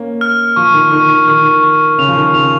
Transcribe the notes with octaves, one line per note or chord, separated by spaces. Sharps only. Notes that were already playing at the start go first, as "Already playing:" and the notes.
Already playing: A#3 C#4
F6
F3 C#6
D#3
D#3 C#6
D#3 F6
C#6
C#3 F7
F3
D#3
C#3 F7